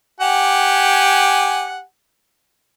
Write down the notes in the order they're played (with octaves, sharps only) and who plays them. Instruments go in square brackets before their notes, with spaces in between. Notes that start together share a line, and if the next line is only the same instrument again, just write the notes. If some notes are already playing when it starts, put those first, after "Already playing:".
[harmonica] G4 F#5 G#5